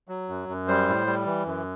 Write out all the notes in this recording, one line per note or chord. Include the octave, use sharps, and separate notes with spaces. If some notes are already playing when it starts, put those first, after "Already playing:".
F#3
F#2
F#2
G3 C5
A2
G3
E3
F#2